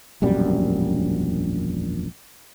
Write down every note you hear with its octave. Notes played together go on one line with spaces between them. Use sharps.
E1 A#1 F#2 G3